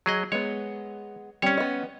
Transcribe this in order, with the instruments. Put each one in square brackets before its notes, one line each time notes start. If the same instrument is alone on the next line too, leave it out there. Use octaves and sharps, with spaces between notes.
[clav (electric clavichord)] F#3 G#4 D#5
[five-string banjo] G#3 B3 [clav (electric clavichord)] C#5
[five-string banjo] G3 C4 [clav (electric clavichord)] C#4 C#5
[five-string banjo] B3 D#5